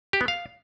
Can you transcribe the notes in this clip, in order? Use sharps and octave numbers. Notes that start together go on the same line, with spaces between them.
G4
B3
F5